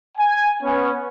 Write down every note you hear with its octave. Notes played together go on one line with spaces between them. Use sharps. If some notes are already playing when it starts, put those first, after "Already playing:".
G#5
B3 C#4